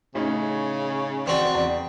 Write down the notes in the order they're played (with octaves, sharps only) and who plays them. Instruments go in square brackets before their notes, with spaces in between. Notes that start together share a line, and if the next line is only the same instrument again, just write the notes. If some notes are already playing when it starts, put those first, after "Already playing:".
[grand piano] A2 C#4 D#4 [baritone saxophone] C#3
[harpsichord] C4 F#4 [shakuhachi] D5
[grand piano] E2